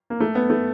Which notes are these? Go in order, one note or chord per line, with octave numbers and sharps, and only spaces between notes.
A#3
A3
B3
A3